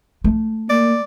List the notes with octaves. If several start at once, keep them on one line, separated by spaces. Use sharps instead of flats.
A3
A#3 D5